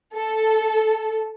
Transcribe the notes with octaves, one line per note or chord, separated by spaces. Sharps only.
A4